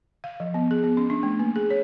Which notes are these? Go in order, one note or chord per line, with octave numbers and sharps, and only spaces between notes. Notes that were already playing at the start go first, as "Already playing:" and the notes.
F5
F3
B3
G#4
B3
C#4
D4
A3
A#3
G#4
C#5